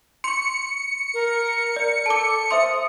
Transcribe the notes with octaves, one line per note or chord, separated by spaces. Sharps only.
C6 C#6 C#7
A#4
D5
A4 A5 D6
C5 E5 C6 D#6